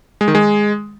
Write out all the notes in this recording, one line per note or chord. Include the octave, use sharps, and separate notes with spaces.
G#3
D#3
G#3